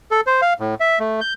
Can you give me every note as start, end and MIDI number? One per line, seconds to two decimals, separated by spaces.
0.11 0.21 69
0.27 0.41 72
0.42 0.54 77
0.60 0.75 45
0.80 0.99 76
0.99 1.20 57
1.21 1.34 91